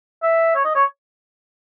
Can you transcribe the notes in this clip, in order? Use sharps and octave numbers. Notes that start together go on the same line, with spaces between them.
E5
C#5
D#5
C#5